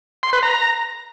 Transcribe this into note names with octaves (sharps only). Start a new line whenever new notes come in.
C6
B4
A#5